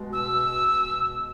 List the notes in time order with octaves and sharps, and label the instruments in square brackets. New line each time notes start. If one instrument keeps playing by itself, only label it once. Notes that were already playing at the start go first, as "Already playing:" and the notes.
Already playing: [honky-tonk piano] B2 G#3
[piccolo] E6